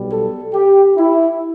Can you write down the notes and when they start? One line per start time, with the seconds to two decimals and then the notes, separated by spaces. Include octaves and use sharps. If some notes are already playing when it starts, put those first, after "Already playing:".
Already playing: B1 B2 G3
0.12 A4
0.54 G4
0.97 E4